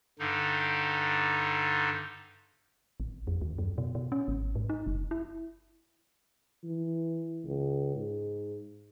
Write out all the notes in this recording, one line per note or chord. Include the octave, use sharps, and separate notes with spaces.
G2 D3 D#4
A1
F2
D#2
F#2
B2
B2
C#4
G#1
G#2
D#4
F#1
E4
E3
C#2
G#2